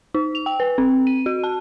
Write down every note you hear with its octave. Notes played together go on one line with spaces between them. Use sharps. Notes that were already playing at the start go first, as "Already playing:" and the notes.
D#4
F7
G5
B4
C4
D#7
F#4
A5